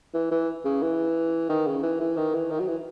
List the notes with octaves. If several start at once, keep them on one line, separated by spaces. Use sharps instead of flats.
E3
E3
C#3
E3
D#3
C#3
E3
E3
D#3
E3
D#3
F#3
E3